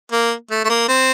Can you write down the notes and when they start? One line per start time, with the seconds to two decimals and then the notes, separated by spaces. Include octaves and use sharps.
0.12 A#3
0.50 A3
0.64 A3
0.69 A#3
0.88 C4